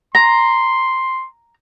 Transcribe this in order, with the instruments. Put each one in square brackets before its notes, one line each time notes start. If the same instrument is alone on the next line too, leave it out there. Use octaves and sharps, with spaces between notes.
[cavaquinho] A#5 [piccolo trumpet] C6